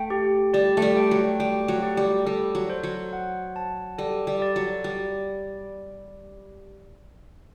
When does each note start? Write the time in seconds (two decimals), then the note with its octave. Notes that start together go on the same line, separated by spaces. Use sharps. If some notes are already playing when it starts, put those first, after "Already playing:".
Already playing: A3 G5
0.10 G4
0.54 G3 D5
0.77 A3
0.82 G3
0.97 G5
1.11 F#3
1.40 G3 G5
1.68 F#3
1.83 G4
1.97 G3
2.26 G3 A4
2.55 F#3
2.70 C5
2.83 F#3
3.13 F#5
3.56 A5
3.98 G3 A4
4.27 G3
4.42 D5
4.56 F#3
4.84 G3 D5